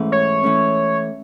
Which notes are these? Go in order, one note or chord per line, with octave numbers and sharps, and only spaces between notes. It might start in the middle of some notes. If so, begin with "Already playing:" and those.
Already playing: G#2 E3 A3 C#4
C#5
E3 A3 C#4